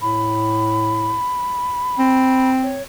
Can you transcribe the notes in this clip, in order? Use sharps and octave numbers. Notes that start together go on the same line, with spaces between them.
A2 B5
C4
C#5